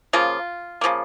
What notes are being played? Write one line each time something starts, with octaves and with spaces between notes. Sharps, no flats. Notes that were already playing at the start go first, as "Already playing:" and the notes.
C#3 F3 A#3 F4
C#3 F3 A#3